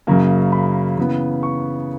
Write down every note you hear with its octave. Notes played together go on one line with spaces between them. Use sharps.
F#2 C#3 F#3 A#3 A#5
B5
C#3 E3 B3
C#6